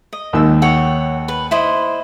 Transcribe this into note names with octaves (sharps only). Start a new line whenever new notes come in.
D#5
D#2 D#3 E6
C#5 F#5 G5
B4
E4 C5 D#5